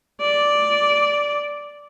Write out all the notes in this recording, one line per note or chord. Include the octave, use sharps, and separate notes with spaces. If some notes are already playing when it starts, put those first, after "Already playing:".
D5